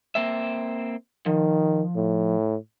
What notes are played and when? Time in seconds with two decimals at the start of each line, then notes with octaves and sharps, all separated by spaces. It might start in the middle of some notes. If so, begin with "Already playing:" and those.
0.15 A#3 C4 E5
1.26 D#3 F3
1.96 A2